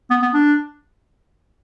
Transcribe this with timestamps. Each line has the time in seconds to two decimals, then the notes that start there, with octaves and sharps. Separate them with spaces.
0.10 B3
0.22 B3
0.34 D4